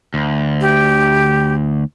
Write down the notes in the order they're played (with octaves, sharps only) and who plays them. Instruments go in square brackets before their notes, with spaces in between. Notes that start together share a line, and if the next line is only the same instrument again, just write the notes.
[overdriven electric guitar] D2
[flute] G4